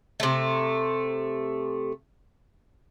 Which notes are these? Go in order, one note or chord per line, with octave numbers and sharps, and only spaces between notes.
C3 A3